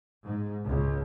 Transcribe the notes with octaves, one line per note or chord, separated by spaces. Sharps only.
G#2
C#2